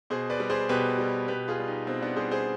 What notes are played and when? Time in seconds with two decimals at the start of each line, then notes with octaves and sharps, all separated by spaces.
0.10 B2 G#4 C5
0.30 B4 D5
0.40 G3
0.50 G#4 C5
0.69 B2 G4 B4
0.99 G3
1.28 B2 G4 B4
1.48 F4 G#4
1.58 G3
1.68 D#4 G4
1.87 B2 C4 D#4
2.02 B3 D4
2.16 G3 G#4 C5
2.31 G#4 C5